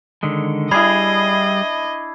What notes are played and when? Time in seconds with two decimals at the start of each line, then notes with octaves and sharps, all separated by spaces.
0.23 D3 D#3 G#3
0.71 G3 D4 E4 G#4 D#5 B5 G#6 C7